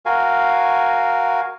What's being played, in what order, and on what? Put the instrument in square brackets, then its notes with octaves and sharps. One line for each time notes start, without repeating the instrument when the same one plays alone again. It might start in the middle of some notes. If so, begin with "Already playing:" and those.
[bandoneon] F#4 A#4 F5 G#5